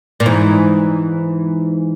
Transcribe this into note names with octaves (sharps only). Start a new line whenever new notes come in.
A#2
G#2 E3